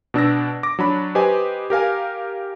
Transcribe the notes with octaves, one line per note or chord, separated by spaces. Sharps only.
B2 D4 E6 A#6
D6 A#6
F#3 D4 B5
G4 B4 C5 D#5 G#5
G4 A#4 F5 G#5